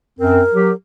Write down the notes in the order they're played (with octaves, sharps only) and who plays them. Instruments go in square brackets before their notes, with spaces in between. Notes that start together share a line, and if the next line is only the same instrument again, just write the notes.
[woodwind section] F#2 C4 [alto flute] A#4
[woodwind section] F#3 G4